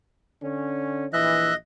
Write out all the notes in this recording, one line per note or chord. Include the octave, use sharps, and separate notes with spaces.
D3 C#4
A#1 E3 D#5 E5 F#6